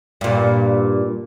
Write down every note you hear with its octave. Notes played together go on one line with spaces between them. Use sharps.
G2 A#2